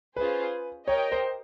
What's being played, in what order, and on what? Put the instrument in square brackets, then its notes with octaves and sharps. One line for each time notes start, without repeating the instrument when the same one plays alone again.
[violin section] C#4 F4 G#4 C5 [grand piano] B4
[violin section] G4 A#4 D#5 G5 [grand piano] C#5
[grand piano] C5